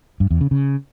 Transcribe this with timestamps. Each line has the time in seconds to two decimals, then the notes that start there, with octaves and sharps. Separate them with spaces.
0.20 G2
0.31 E2
0.41 C#3
0.51 C#3